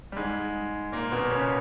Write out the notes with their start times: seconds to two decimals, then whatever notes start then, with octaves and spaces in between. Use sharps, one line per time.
0.12 G3
0.17 G#2 G#3
0.92 A#2 A#3
1.11 B2 B3
1.31 C#3 C#4